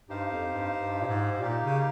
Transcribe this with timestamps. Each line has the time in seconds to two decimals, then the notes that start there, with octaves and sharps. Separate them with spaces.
0.09 G2 D#4 G4 C5 F5
0.31 F2
0.52 G2
0.75 G2
1.01 A#2
1.08 G#2
1.31 G#2
1.40 A#2 A#3 D#4 G4
1.63 C#3